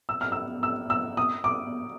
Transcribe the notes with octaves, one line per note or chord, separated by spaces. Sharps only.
E6
F6
E6
E6
E6
D#6
D6